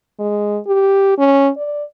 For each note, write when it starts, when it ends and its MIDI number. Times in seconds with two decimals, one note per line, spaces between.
0.19 0.59 56
0.67 1.17 67
1.18 1.50 61
1.57 1.84 74